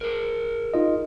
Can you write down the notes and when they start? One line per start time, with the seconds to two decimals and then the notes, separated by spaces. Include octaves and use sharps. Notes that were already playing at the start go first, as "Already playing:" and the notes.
0.01 G#4 A#4
0.74 D#4 F4 D#5